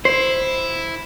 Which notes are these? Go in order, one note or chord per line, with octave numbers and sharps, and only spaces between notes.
E4 C5